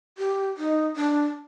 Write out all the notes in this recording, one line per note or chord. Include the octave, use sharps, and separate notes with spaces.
G4
D#4
D4